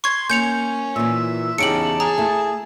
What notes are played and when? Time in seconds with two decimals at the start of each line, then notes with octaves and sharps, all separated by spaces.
0.04 C6 C#6 G#6
0.30 A#3 C#4 G6 C#7 F7
0.96 A#2 E3 E5
1.58 E2 C#3 D#4 G4 A5 C#7 D7 F#7
2.00 G#4 A#5
2.18 A3 E4